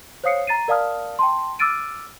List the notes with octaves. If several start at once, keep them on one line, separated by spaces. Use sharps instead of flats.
C5 C#5 F5 D#6 C7 C#7
A#5 A6 C7 D#7
A#4 D5 F5 A5 D#6 F6
G5 A5 C6
D6 E6 F6 A6 D7 D#7